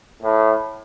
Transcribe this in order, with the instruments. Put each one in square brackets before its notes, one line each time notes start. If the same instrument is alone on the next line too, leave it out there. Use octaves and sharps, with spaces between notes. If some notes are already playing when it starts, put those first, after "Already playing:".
[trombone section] A2